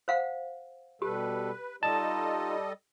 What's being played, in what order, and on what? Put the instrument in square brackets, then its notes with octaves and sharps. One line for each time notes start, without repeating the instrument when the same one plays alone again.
[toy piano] C5 F5 F#5
[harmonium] B2 G3 A4 [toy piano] G4 [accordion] B4
[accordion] G3 A4 D#5 [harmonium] D#4 F4 [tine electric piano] A5